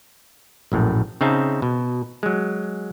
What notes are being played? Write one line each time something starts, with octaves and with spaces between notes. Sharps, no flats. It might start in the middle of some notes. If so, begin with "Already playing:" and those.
A#1 F#2 A2
C#3 C4 D#4 E5 A5
B2
F#3 G#3